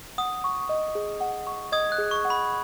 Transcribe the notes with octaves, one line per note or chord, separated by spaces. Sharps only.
F#5 D#6
C#6
D#5
G#4
F#5
C#6
D#5 D#6 G#6
F#6
G#4
C#6
F#5
B5